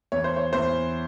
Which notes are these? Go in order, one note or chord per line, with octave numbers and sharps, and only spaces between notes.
E2 C#5
C5
C#5
E2 C5